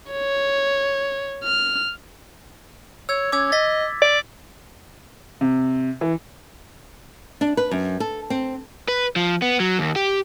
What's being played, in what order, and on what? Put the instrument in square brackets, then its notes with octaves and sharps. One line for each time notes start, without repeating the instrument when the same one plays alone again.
[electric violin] C#5
F6
[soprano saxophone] C#5 [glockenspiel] E6 G#6
[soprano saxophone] C#4 [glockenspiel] D6 E6 G#6
[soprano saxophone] D#5 [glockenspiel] A6 B6
[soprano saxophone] D5
[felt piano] C3
E3
[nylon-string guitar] D4
B4
F#2
A4
C4
[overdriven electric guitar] B4
F3
B3
F#3
D#2
G4